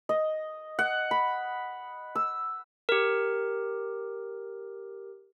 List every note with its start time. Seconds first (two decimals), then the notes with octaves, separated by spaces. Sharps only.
0.09 D#5
0.79 F#5
1.11 B5
2.15 E6
2.89 G4 A#4